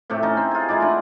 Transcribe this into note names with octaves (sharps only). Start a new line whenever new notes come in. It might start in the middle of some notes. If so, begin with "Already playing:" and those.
A2 C3 A3 G4
C#4 D#4 A4 A#5
C4
F4 G#4
G#3 D#4 E4 D5
A3 D4 F#5